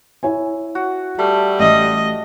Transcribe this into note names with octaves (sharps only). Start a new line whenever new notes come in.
E4 C#5 G#5
F#4
G3 A3
A1 D#5